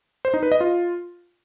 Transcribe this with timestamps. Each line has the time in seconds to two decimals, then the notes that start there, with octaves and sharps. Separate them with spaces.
0.25 C5
0.34 D#4
0.43 B4
0.52 D#5
0.61 F4